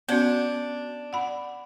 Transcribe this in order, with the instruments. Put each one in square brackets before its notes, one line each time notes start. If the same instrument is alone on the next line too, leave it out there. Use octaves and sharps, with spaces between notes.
[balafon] B3 C#4 F#4 [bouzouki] D4
[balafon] F#5 B5